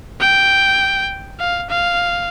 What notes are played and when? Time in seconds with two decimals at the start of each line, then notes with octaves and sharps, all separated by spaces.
0.20 G5
1.39 F5
1.69 F5